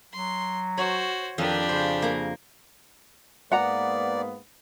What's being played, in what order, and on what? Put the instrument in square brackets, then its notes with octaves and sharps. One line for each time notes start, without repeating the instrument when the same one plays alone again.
[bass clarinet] F#3 [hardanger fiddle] C6
[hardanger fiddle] F#4 C5 [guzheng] C#5
[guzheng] F2 B4 [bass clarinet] D#3 [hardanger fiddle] D4 G4
[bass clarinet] C#3 [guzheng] C5
[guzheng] A#3 A#5
[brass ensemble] G#2 A#3 B3 [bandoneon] D5 [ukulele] F#5 A#5